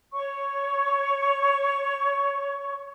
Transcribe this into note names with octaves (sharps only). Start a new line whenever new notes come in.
C#5 C#6